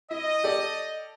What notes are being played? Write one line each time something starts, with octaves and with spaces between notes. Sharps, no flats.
E4 D#5
G4 A4 D5